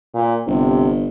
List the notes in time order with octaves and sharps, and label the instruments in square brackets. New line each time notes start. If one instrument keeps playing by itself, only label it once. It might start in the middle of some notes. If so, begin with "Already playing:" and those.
[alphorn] A#2
[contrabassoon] G1 [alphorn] C3